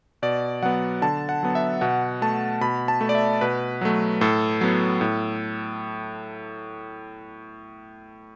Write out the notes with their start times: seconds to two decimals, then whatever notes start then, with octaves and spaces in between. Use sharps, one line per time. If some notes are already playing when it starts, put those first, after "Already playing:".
0.22 B2 D5
0.62 F#3 B3 F#5
1.02 D3 A5
1.29 F#5
1.43 F#3 B3
1.55 E5
1.81 B2 F#5
2.22 A3 A5
2.61 B2 B5
2.88 A5
3.01 A3
3.09 D5
3.15 E5
3.41 B2 B4
3.81 F#3 A3
4.21 A2 A4
4.61 F#3 B3
5.01 A2